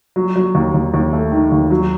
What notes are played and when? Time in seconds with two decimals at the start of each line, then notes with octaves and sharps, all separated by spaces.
0.16 F#3
0.36 F#3
0.55 D#2
0.74 D#2
0.94 D#2
1.13 A3
1.32 D#3
1.52 D#2
1.71 F#3